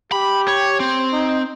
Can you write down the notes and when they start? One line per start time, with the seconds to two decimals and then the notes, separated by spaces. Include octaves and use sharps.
0.12 G4 B5
0.48 C#5
0.80 C4
1.13 D#4